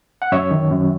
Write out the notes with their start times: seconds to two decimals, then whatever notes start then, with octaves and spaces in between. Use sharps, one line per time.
0.22 F#5
0.32 F#2 C#5 E5
0.51 D#3
0.70 F#2